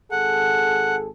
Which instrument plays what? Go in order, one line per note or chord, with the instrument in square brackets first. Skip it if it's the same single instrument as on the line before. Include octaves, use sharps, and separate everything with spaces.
[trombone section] G#1 G#4 A4 [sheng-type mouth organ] F#5